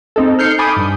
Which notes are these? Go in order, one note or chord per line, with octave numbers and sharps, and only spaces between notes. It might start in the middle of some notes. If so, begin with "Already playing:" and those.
C4 D#4 A4
F6 G6 C7 C#7
G#5 A5 B5 D6 D#6 G6
G2